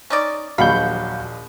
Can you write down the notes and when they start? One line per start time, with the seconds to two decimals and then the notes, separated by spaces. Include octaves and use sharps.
0.10 C#4 D#4 D5
0.58 A#1 D#2 F#3 F5 F#5 B5 C#6 G6